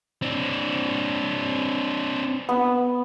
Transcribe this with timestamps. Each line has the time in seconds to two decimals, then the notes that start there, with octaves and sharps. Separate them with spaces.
0.23 C4 D4
2.49 B3